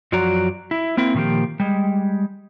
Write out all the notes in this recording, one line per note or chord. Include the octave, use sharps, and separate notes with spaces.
F#2 F3 F#3 F#4 D5 A#5
E4
A#3 C4 E4
A#2 D#3 F3 A#3 G4
G3 G#3